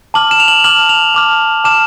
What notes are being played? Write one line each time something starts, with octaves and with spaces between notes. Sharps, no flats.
A5 D6 F6 F#7
E7
F7
F#7
A5 D6 F6 F#7
F7
A5 D6 F6
A5 D6 F6 E7